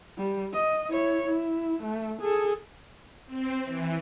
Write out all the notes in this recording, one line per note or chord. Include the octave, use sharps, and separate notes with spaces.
G3
D#5
E4 C#5
E4
A3
G#4 A4
C4
E3